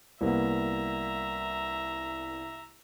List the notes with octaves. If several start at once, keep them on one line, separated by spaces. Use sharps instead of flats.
C2 A#3 B3 E5 A#5